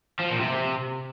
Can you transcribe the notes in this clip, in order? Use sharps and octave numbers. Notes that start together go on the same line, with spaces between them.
F3
A#2
C3